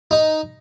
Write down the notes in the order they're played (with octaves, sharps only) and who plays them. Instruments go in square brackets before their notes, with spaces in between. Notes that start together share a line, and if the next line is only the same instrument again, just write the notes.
[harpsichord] D#4